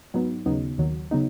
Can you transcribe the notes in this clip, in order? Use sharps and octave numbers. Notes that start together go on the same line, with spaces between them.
G#2 F#3 B3 D#4
D#2 C#3 F#3 B3 D#4
D#2 D#3 F#3
C#3 F#3 B3 D#4